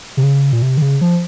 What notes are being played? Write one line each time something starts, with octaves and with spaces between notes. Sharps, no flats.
C3
C#3
A#2
C3
D#3
C#3
F3